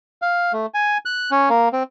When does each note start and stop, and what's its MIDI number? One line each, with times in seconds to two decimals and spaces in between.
0.22 0.52 77
0.53 0.66 57
0.74 0.98 80
1.05 1.31 90
1.31 1.49 61
1.50 1.69 58
1.73 1.83 60